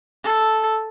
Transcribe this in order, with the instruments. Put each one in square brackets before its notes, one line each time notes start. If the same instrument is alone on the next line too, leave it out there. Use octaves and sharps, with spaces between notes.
[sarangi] A4